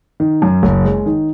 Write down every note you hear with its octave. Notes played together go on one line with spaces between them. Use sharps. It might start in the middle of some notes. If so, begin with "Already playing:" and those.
D#3
F#2
F#1
G#3
D#3